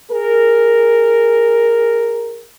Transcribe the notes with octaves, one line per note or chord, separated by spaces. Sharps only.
G#4 A#4